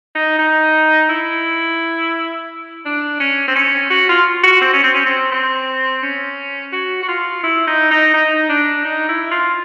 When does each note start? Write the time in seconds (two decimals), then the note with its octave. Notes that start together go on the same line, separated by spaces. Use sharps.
0.15 D#4
0.39 D#4
1.09 E4
2.85 D4
3.20 C#4
3.48 C4
3.55 C#4
3.90 F#4
4.09 F4
4.43 F#4
4.61 C4
4.73 C#4
4.84 C4
4.94 C#4
5.06 C4
5.32 C4
6.03 C#4
6.73 F#4
7.03 F#4
7.08 F4
7.43 E4
7.67 D#4
7.91 D#4
8.14 D#4
8.49 D4
8.85 D#4
9.09 E4
9.31 F4